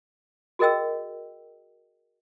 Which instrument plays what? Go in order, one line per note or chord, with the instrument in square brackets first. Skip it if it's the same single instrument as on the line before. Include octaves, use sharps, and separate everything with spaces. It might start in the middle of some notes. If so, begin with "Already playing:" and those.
[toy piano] F#4 G#4 A#4 D#5 G5 E6